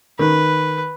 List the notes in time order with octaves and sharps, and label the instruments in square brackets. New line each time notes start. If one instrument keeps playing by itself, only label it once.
[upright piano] D#3 [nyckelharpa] B4